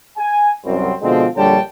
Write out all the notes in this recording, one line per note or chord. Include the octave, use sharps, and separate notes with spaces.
G#5
C2 F#2 C4
B2 D3 F3 G#3 C4
A#1 D3 G3 C#5 G5 A5